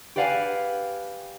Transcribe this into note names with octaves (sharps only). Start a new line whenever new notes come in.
G4 B4 D5 F5 F#5 G#5